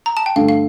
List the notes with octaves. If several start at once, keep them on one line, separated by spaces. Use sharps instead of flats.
A#5
A5
G5
G2 D3 A3 F5
F5